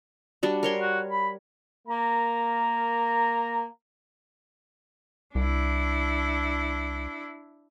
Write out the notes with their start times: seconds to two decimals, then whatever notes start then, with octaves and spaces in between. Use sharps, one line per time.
0.43 G3 D4 F#4
0.63 A#4 C#5 C6
0.80 F#4
1.10 B5
1.88 A#3 A#5
5.35 C2 D4 E4